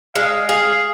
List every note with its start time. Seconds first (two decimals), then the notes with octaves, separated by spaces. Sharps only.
0.15 G#3 F5
0.48 G#4 F5